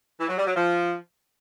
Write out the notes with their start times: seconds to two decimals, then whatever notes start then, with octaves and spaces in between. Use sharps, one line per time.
0.20 E3
0.29 F#3
0.38 G3
0.46 F#3
0.55 F3